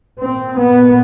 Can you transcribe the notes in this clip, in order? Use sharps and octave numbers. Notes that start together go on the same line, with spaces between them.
A#2 C4
B3